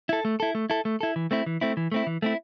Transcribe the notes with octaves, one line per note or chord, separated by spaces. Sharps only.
E4 A4
A3
E4 A4
A3
E4 A4
A3
E4 A4
E3
A3 C4 E4
E3
A3 C4 E4
E3
A3 C4 E4
E3
A3 C4 E4